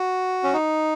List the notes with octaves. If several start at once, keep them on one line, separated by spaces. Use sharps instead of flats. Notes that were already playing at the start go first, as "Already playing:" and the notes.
Already playing: F#4
C#4
D#4